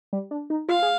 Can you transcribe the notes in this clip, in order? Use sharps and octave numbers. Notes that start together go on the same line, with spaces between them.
G3
D4
D#4
F4 F5
G#4